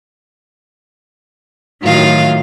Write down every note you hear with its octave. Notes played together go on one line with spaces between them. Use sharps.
A2 D#3 F#3 F4 F5